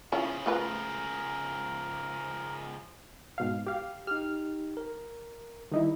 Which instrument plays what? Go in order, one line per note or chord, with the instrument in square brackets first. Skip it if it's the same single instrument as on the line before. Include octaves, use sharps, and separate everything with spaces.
[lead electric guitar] C#3 F3 [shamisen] C#4 E4 F4
[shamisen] A3 F4 B4 [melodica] A#4
[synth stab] G#2 B2 F5
G4 F5
[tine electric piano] D#4 G4 [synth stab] F6
[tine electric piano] A#4
[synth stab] D#3 D#4 E4 [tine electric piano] G3